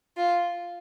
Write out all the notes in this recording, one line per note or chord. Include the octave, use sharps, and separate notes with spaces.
F4